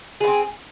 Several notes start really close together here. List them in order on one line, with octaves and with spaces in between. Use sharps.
G#4 B3 C4